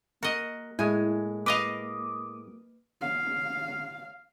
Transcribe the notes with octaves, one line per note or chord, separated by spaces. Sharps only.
A#3 F#4 A#4 D#5
A2 G#3 E4 G#5
B4 D#5 F5 D6 D#6
F5